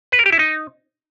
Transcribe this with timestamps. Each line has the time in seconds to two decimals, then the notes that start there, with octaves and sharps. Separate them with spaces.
0.12 B4
0.19 A#4
0.26 G4
0.32 E4
0.39 D#4